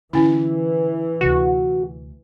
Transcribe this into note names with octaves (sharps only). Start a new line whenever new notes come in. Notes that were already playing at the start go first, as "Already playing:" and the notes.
D3 E3 C#4 E4 F4
D2 C3 F#4